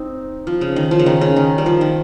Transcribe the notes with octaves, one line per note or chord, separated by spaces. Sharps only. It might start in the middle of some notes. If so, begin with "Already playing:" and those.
Already playing: C4 D#4
F3
C#3
D#3
F3
C#3
D#3
C#3
D#3
G3
F3
D#3